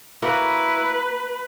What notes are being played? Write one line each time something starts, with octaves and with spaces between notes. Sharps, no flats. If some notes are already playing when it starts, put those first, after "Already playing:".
A#3 E4 F#4 B4